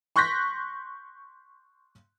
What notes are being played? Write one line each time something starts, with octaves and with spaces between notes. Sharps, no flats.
C6 C#6 F#6 G6 A#6 B6